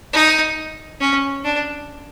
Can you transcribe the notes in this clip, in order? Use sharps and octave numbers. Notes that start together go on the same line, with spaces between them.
D#4
C#4
D4